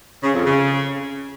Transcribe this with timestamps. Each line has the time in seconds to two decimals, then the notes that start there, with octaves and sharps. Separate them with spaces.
0.23 C#3
0.34 F2
0.45 C#3